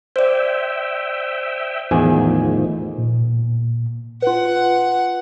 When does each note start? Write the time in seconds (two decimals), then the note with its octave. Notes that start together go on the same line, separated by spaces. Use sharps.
0.16 C5 D5 E5 G5
1.91 E2 A2 D#3 F3 G#4 G#5
2.98 A#2
4.22 F4 B4 F#5